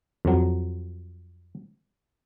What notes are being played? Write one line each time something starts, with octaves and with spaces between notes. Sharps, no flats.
F2 F#3